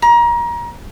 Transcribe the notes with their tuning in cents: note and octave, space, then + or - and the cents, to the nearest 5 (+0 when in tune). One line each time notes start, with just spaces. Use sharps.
A#5 +30